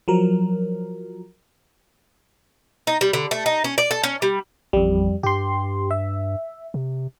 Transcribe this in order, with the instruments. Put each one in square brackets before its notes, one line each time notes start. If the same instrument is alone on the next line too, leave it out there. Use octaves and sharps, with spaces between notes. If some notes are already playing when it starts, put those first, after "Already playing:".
[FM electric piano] F3 F#3 A#4
[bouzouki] D#4
G3
D3
A3
D#4
C#4
D5
A4
C#4
G3
[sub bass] A1 [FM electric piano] F2 G3
[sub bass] G2 [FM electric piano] G4 C6
[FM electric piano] E5
[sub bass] C3